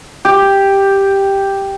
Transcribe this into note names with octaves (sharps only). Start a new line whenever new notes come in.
G4